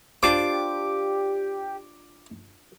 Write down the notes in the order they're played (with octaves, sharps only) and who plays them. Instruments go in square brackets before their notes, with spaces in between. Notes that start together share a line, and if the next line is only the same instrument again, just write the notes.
[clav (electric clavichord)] D4 F4 C5 [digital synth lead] G4 [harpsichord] D6